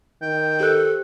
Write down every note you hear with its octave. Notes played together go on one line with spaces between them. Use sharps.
D#3 G5
G4 A4 C5 F#6